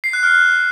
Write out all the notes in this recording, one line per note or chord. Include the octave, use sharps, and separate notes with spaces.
C7
F#6
F6